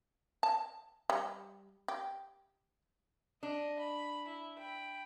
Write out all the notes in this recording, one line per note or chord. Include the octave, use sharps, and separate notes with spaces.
A5
G3
G4
D4 D#5
B5
E4
G5 B5